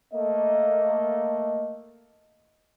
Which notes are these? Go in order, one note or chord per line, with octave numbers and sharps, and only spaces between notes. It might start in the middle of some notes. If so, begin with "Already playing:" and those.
A3 A#3 D#5